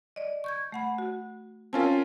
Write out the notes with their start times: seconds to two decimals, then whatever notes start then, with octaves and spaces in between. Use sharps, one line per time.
0.16 D5 D#5
0.44 C#6 G6 G#6
0.72 A3 F#5 B5
0.98 F#4
1.73 C4 C#4 F4 A#4 G#5 A5